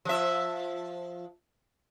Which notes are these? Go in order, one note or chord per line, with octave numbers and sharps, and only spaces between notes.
F3 E5